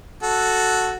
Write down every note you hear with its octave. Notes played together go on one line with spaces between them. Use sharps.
F#4 A4